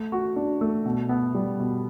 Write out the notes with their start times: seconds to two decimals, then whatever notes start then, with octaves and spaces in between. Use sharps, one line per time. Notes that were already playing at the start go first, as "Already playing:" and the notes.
Already playing: A3
0.12 F#4
0.36 D4
0.61 A3
0.86 B2
1.09 B3
1.35 G3
1.59 B2